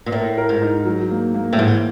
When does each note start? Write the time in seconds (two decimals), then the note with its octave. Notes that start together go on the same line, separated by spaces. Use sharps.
0.06 A#2
0.12 A2 A#4
0.38 A#4
0.49 G#2
0.62 D#4
0.85 F#3
1.10 A#3
1.34 A#3
1.53 A2
1.58 G#2 E3